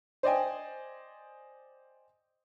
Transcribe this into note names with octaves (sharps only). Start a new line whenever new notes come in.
C5 D5 D#5 G5 G#5